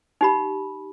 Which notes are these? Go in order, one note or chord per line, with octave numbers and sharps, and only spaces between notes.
D#4 G4 B5